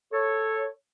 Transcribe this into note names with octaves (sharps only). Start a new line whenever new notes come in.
A4 C#5